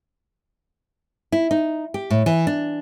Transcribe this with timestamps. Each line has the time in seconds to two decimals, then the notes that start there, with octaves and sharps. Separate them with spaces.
1.32 E4
1.51 D#4
1.94 G4
2.10 A2
2.26 E3
2.47 D4